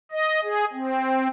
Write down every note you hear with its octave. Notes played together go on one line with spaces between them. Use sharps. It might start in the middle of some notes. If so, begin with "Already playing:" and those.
D#5
G#4
C4